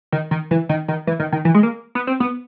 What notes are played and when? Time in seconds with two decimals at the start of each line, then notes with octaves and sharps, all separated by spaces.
0.12 D#3
0.31 D#3
0.51 E3
0.69 D#3
0.88 D#3
1.07 E3
1.20 D#3
1.33 D#3
1.45 E3
1.55 G#3
1.63 A#3
1.95 B3
2.07 C4
2.20 B3